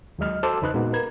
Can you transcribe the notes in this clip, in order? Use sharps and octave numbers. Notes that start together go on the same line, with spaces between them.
D#2 F#3 G#3 D#5 F6
F#4 A4 C5 A5 D6 E6
E2 C#3 D#4 B4 D#5 F#6
A#2 G#3 A#3 B3 D#4 F#4
A#4 B4 G#6